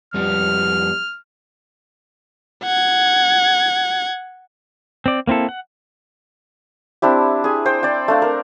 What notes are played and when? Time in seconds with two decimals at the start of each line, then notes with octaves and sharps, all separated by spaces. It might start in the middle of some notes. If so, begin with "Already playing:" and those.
0.14 F2 G3 B3 F6
2.64 F#5 G#6
5.06 C4 D5
5.27 A#3 C4 E4 A4
5.49 F#5
7.02 C4 D4 E4 G4
7.44 G#4 G#5
7.66 C5 G5
7.83 D5 G5
8.08 A3 D4 F5
8.22 A#4